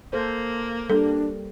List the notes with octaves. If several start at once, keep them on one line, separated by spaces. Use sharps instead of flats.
A#3 A4 C5
G3 D4 A4